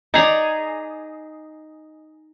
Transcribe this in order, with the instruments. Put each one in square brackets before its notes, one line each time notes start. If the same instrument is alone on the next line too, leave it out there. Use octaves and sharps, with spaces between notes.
[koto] D#4 G#4 [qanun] D5 A#5 D6 [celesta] D#5